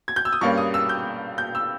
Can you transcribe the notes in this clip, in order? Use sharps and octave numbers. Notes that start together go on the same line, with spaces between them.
G#6
G6
E6
D#6
G2 G3 A#3 C#4 C#6
D#6
E6
G6
G6
E6